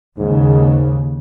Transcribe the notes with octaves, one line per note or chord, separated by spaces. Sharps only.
D#2 G#2 C#3